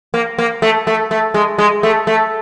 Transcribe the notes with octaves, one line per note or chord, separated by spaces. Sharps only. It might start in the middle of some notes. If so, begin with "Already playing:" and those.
A#3
A#3
A3
A3
A3
G#3
G#3
A3
A3